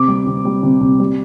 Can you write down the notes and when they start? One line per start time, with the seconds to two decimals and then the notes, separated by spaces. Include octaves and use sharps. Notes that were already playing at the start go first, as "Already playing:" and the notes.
Already playing: C3 D6
0.08 G3
0.27 C3
0.45 G3
0.63 C3
0.81 C3
1.00 G3